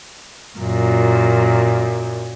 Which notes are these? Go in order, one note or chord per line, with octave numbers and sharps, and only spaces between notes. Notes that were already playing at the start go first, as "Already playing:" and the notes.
F#2 A#2